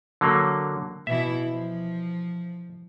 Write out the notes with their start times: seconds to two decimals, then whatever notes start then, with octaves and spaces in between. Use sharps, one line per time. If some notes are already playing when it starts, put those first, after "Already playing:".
0.21 D3 F#3 A#3
1.07 B2 E3 E4 E5
1.50 F3